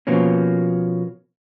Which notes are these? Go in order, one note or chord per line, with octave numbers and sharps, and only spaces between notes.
B2 F3 A#3 C#4